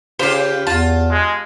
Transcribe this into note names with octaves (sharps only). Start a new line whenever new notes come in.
C#3 F4 G4 C5 F5
E2 F4 A5
G#3